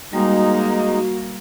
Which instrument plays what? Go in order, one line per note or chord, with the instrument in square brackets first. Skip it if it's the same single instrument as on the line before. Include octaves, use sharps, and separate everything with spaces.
[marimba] G3 [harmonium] G#3 D#4 [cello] A#3 [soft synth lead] F#4